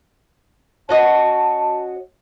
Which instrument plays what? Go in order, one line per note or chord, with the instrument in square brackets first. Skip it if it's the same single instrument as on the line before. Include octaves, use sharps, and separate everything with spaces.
[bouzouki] C#4 F#4 D#5 [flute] A5